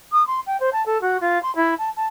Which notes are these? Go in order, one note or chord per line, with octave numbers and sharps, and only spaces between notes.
D#6
C6
G5
C5
A5
A4
F#4
F4
C6
E4
A5
A5